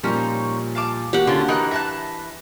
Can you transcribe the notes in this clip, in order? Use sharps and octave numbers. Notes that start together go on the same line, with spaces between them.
A#2 F3 G3 C#4 D#4 C5
F5 A5 D6
A#3 F#4 G4 F#5
D3 C#4 F4
E3 D#4 A#4 F#6
E5 A5 F#6 A#6